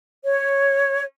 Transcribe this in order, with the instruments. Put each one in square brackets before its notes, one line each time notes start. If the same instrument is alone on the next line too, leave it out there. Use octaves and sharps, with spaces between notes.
[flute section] C#5